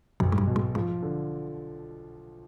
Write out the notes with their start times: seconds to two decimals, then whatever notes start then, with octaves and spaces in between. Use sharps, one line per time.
0.20 B1 F#2
0.32 G#2
0.38 G2
0.47 B2
0.56 G#2
0.75 G#2 F3
1.02 D3